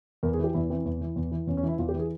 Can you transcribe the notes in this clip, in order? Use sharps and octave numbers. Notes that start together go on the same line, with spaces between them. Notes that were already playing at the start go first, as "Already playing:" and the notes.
E2 A#4
G#4
E3 G4
E2 E4
E3 C4
E2
E3
E2
E3
E2 C#4
C#4
E3
E4
E2 F4
G4
E3
G#4